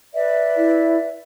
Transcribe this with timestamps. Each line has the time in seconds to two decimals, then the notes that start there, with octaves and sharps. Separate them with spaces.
0.14 B4 D5 E5
0.57 E4